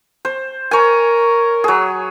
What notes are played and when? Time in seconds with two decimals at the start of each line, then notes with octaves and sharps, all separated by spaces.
0.25 C5
0.71 A#4 C#5 G#5
1.64 F#3 G#4